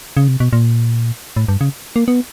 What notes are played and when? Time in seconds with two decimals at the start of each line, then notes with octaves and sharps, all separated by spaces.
0.17 C#3
0.28 C3
0.40 B2
0.53 A#2
1.36 A2
1.48 G2
1.61 C#3
1.96 A#3
2.08 B3